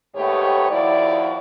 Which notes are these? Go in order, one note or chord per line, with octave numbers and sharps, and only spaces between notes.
D#2 G#2 A3 B3 G4 C#5
D#2 F3 E4 F#4 D5